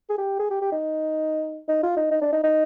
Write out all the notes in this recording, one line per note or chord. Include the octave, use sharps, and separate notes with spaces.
G#4
G4
G#4
G4
G4
D#4
D#4
F4
D#4
D#4
D4
D#4
D#4